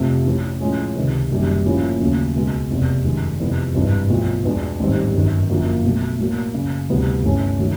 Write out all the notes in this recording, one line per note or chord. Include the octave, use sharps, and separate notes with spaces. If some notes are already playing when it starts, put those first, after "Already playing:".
Already playing: F2 C3 F3 A3
A1 A2 E3
A2 F3 G#3 C#4
C#2 C3 D#3
F#1 F#2 D#3 G3
A2 F3 A#3 C#4 E4
D#2 C#3 F#3 A3
C#2 B2 G#3
F1 E2 C3
F#2 D#3 G#3
F2 C3 E3 G#3 B3
G#1 G2 E3
B1 A2 F3 A3
E2 B2 G#3 B3 D4
A1 G#2 D#3 G3 C4
G1 F#2 D#3
F#1 F#2 D3 F3 A#3
B1 B2 F#3 A3
A2 F#3 A#3
F#2 C#3 F#3
D2 C3 E3 G3 B3
G1 G2 E3 A3 C#4
D#3 F#3 A3